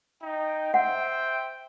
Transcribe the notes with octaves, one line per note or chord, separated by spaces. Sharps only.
D#4 G5
C5 E5 F#5 G5